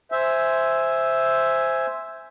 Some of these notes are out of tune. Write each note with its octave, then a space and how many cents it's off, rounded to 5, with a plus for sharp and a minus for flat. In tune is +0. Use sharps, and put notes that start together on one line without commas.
C5 +0 E5 +0 G#5 +0